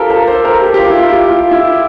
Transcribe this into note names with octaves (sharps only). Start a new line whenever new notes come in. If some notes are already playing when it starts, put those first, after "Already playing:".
Already playing: F4 G4 A4 A#4 C5
A#4
C5
A#4
G4
G4
F4
E4
F4
G4
F4
E4